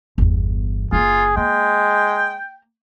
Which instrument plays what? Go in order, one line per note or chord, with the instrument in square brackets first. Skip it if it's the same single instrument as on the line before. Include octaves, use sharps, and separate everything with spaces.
[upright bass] G1 E2
[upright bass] F#1 A#3 [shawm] F4 [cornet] G#4
[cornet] G#3 [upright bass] A#3 [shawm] G5